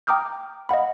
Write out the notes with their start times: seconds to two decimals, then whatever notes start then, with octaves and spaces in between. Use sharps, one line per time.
0.07 G5 A#5 D6 D#6 F6 G6
0.69 D#5 F5 F#5 B5